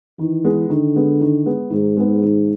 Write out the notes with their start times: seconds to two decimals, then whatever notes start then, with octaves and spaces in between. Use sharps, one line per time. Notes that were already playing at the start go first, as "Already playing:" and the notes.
0.19 D#3 E3
0.45 G#3 B3
0.70 D3 D#3
0.95 G#3 B3
1.21 D#3
1.46 G#3 B3
1.70 G#2 D#3
1.97 G#3 B3
2.22 D#3